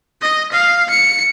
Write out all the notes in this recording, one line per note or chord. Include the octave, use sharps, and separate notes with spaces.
D#5
F5
C#7